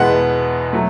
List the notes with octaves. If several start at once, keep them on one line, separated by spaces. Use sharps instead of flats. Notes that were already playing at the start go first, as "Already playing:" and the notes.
Already playing: E2 B2 G#3 B3 F#5
F#3 A3